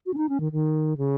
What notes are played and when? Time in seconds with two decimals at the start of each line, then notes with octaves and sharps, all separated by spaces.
0.06 F#4
0.13 C#4
0.17 D#4
0.29 C#4
0.40 D#3
0.52 D#3
0.97 C#3